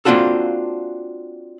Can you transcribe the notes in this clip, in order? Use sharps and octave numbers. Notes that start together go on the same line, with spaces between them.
A#3 C4 D4 F4 F#4 A4